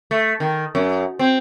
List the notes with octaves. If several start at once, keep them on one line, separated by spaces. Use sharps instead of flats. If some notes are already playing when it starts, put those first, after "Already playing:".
A3
D#3
F#2
C4